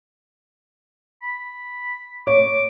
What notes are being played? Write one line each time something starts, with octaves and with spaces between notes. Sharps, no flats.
B5
C#5 D6